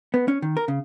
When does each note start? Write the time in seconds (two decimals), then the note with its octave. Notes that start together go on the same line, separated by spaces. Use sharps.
0.14 B3
0.28 C#4
0.42 D#3
0.57 A#4
0.68 C#3